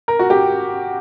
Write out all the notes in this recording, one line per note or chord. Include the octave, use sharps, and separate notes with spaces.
A#4
F#4
G4